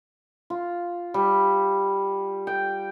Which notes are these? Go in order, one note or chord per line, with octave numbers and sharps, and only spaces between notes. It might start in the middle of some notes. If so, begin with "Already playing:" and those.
F4
G3
G5